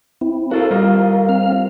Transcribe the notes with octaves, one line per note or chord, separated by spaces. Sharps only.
C4 E4
F#4 A4 A#4 C5 F5
G3 F4 D#5
C4 F5 F6